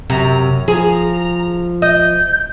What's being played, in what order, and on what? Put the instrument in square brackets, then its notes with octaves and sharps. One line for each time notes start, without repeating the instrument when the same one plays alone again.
[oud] F#2 [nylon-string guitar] C3 [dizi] A#5
[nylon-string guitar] F3 [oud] G#4 [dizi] A#5
[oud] D#5 [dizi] G6